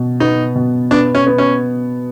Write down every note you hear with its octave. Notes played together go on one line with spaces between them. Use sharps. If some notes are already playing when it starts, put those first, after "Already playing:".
Already playing: B2
B3 D#4
B2
B3 D4
C#4
B3
C#4